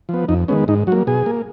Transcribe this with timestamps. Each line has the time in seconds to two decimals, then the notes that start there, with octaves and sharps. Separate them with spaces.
0.09 F3 B3
0.28 F2 D#4
0.48 D#3 G#3 B3 C#4
0.68 G#2 D#4
0.87 F#3 F#4
0.92 A#3
1.07 B2 G#4
1.26 A#3